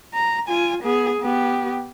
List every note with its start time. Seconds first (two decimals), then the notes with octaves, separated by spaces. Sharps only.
0.14 A#5
0.49 F4 G#5
0.83 B3 G#4
1.21 B3 G4